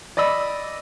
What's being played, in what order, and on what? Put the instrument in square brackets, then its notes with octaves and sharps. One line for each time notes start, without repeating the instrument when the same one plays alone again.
[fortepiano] D5 D#5 B5 E6